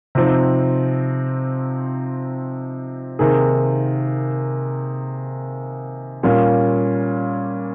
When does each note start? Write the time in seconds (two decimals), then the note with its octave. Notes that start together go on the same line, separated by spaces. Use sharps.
0.15 C3 F3 C4 D#4
3.19 C3 D#3 A#3 D#4 G#4
6.23 A#2 G3 A#3 C#4 F4